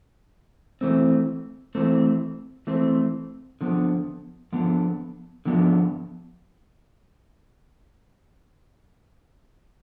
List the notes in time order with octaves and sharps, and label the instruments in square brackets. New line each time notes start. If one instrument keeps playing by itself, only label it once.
[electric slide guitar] E3 A3 C4
E3 A3 C4
E3 A3 C4
D3 F3 B3
D3 F3 B3
D3 F3 B3